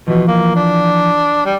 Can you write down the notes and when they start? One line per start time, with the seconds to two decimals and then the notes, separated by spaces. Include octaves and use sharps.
0.08 B2 E3 F3
0.28 A#3
0.56 D4
1.45 G3